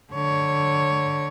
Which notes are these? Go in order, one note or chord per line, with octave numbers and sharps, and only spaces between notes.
D3 C#5